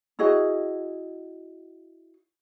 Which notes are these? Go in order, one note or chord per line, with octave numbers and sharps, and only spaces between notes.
E4 F#4 G#4 D#5